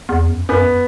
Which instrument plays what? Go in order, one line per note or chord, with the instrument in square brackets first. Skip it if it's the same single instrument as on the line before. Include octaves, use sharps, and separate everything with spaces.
[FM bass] E2
F#2
[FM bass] F#2 [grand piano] B3